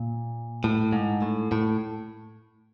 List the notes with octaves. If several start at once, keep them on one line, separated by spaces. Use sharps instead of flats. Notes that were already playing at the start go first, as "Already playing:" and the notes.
Already playing: A#2
A2
G#2
A2
A2